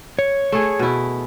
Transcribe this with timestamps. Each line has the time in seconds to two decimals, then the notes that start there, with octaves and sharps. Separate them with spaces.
0.19 C#5
0.52 A3 G#4
0.79 B2 E4